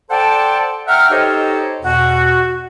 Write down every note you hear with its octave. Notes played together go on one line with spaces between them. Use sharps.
A4 C5 D5 F#5 G5 A5
E5 F#5 G5 A#5 F6
D#4 G4 A4 C5 C#5 D#5
E2 B2 F#4